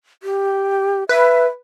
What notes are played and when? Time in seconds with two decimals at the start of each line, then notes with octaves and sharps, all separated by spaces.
0.23 G4
1.09 B4 E5